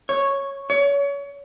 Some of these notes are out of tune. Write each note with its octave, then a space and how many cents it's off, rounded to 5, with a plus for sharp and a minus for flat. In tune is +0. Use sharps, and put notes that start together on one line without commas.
C#5 -5
C#5 +30